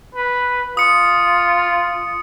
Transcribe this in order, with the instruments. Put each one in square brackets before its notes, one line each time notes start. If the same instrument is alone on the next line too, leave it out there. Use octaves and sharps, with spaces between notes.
[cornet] B4
[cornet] F4 [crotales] D#6 C#7